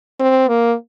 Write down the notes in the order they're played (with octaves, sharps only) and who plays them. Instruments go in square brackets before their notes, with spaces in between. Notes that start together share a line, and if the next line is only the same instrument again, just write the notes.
[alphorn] C4
A#3